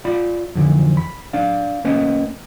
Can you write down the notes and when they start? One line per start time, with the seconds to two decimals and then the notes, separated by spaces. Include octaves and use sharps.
0.05 F4 D5 B5
0.55 F2 D3 E3
0.97 B5
1.33 D4 D5 F5
1.85 A#3 C#4 B4 D#5